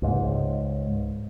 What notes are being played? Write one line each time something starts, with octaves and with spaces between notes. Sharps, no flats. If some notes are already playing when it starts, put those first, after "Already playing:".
C#2 G#2